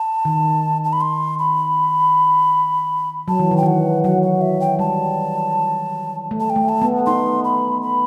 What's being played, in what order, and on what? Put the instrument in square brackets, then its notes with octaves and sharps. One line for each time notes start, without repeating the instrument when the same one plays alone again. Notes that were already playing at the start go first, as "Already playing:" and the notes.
Already playing: [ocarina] A5
[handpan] D#3
[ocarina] A5
B5
C6
B5
[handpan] F#3 [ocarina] A5
[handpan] E3
D#3
[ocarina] G5
[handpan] E3 [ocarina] F#5
[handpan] F#3 [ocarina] F#5
[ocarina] F#5
E5
G5
[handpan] G3 [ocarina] A5
[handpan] A3
[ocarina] A5
G5
[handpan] A3
[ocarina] A5
[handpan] B3
[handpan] D#4 [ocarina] C6
[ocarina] B5
B5